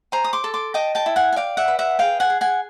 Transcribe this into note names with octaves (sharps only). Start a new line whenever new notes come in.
C5 G#5 A#5
D#6
C6 D6
A4
C6 D6
D#5 G5 A5
G5 A5
E4
F#5 G#5
G#5
D5 F5 G5
E5 F#5
B4
E5 F#5
G#4 F5 G5
F#5 G#5
G#4
F#5 G#5